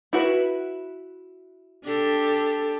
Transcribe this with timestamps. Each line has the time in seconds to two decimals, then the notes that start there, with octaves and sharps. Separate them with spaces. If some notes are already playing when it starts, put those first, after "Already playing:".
0.13 E4 F#4 B4
1.84 D4 G4 A4